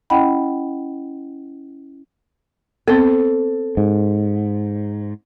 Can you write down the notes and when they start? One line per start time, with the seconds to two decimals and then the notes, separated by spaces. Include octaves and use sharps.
0.10 C#4 E4 D#5 F#5 G5 B5
2.88 B3 C4 A4 C5
3.77 G#2